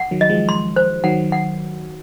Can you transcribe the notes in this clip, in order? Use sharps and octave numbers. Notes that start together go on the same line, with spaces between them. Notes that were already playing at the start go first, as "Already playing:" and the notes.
Already playing: F#5
D#3 F#3
D#5
F3 G#3
C6
C5
D#3 F#3 F#5
F#5